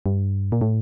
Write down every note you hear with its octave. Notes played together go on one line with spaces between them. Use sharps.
G2
A#2
A2